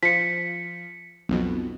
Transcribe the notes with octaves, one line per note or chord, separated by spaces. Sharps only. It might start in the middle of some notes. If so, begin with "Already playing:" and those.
F3 B6 C#7
B1 F2 B2